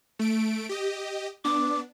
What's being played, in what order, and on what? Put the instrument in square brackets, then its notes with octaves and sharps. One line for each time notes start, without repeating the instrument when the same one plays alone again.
[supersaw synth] A3 D7
G4 D#5
[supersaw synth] B3 D4 [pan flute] D6